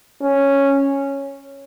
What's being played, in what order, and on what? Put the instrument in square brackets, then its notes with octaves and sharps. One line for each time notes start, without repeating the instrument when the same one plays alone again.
[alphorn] C#4